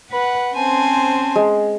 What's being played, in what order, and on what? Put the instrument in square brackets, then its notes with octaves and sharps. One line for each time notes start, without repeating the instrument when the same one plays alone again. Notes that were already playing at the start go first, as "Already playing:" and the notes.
[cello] B4 [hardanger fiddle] F#5
[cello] C4 C#4 [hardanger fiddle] C5 G#5 [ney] A5
[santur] G#3